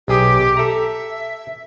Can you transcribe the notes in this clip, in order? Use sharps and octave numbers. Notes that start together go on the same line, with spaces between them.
B1 G4 G#4 G#5
A4 E5 A#5